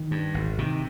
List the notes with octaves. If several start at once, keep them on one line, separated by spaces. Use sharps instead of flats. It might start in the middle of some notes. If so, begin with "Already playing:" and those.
Already playing: D#3
G2
G#1
C3 D#3